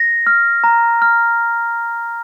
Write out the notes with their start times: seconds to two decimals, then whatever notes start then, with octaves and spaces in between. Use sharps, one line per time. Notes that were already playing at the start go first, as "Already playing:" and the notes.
Already playing: A#6
0.27 F6
0.64 A#5
1.02 F6